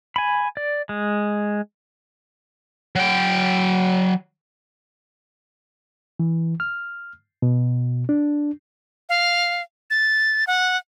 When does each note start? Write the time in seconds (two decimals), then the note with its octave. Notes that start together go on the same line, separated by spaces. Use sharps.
0.16 G#5 B5
0.57 D5
0.89 G#3
2.95 F#3 G5
6.20 E3
6.60 F6
7.42 B2
8.09 D4
9.09 F5
9.90 A6
10.47 F#5